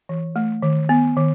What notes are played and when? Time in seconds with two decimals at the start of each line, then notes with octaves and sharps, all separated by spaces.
0.09 E3
0.36 A3
0.62 D#3
0.89 B3
1.17 D#3